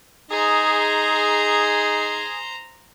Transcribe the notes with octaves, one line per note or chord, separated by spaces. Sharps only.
D#4 G#4 C5 A#5